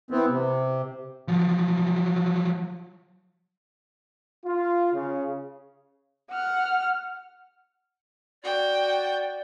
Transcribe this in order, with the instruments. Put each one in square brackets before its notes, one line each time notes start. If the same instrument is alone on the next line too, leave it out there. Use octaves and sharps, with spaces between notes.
[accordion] E3 B3 C4
C3
[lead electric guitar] F3 F#3
[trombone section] F4
C#3
[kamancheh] F#5 F6
[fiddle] F#4 G5 [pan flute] D5